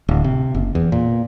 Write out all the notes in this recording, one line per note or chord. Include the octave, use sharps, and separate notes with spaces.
D1
C3
F#1
E2
A#2